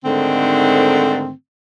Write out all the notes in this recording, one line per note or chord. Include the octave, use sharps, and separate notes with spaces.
G#2 D3 D#3 A3 C4